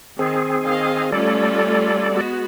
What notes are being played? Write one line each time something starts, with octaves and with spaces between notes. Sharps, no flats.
D#3 C4 G#4
D#3 D#5 F5
G3 A3 C#4 F4 A4 D5
G#3 B3 F#4